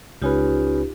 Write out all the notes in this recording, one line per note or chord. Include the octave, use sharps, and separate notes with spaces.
C#2 C#4 D#4 F4 G4 B4